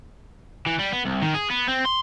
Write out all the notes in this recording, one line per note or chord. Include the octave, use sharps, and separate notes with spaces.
E3
G3
B3
C2
D#3
G#4
B3
C4
C6